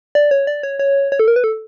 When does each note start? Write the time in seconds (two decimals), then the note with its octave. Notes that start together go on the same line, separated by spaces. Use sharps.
0.15 D5
0.31 C#5
0.47 D5
0.63 C#5
0.79 C#5
1.12 C#5
1.19 A4
1.28 A#4
1.36 B4
1.44 A4